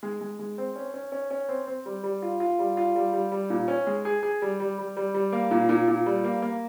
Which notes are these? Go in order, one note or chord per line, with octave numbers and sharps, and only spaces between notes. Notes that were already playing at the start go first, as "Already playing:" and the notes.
G#3
G#3
G#3
C4
C#4
C#4
C#4
C#4
C4
C4
G3
G3
F4
F4
G3
F4
G3
G3
G3
A#2
C#4
G#3
G#4
G#4
G3
G3
G3
G3
G3
A#3
A#2
A#2
A#2
G3
A#3
A#3